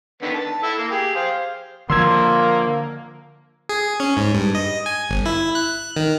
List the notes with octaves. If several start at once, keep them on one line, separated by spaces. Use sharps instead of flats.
D3 D#3 B3
A5
E4 A4 E5
A#3
G4 G#4
C5 F5
D3 F3 A#3 C6 E6 G#6
G#4
C#4
G#2
G2
D#5
G#5
G1
E4
F#6
D#3